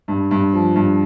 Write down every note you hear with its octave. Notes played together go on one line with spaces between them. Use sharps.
G2
G2
F3
G2